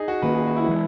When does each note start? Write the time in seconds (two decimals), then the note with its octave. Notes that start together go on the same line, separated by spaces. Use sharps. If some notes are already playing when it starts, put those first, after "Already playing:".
Already playing: D#4 G#4
0.08 F#4
0.22 D#3 A#3 C#4 B4
0.34 G#4
0.46 F#4
0.56 E4
0.68 E3 G#3